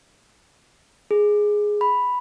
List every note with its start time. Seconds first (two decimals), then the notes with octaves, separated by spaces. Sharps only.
1.11 G#4
1.81 B5